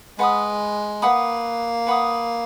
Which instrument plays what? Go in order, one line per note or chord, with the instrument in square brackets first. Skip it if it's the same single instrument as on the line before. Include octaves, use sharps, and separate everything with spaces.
[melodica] G#3 [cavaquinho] B4 F#5 B5 D#6
[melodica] A#3 [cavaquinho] B4 F#5 B5 D#6
[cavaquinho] B4 F#5 B5 D#6